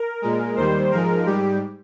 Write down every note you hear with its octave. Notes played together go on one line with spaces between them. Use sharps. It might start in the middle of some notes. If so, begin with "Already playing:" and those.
Already playing: A#4
A#2 G#3
D#2 D#3 G3 C5
G#2 F3 G#3 A#4
G#2 G3 G4